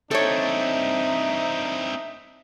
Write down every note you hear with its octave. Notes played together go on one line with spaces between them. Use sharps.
C4 D4 D#4 A4 C#5 E5